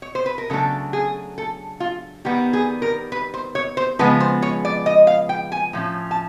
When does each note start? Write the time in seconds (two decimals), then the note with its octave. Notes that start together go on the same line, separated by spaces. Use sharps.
0.02 C#5
0.15 C5
0.26 B4
0.38 A#4
0.50 C#3 F#3 A3 D4 A4
0.93 G#4
1.38 A4
1.80 F4
2.25 D#3 G3 B3 G4
2.53 G#4
2.82 A#4
3.12 B4
3.34 C5
3.55 C#5
3.77 C5
3.99 C#3 F3 G#3 B3 B4
4.20 C5
4.42 C#5
4.65 D5
4.86 D#5
5.07 F5
5.29 G5
5.52 G#5
5.73 A2 F3 C#4
6.11 A5